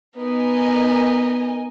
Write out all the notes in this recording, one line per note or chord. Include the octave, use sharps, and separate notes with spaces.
B3 D#4 A#4 D#5 G#5